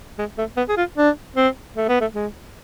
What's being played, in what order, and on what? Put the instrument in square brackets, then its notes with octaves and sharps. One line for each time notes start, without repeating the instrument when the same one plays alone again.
[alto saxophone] G#3
A3
B3
G#4
F4
D4
C4
A3
B3
A3
G#3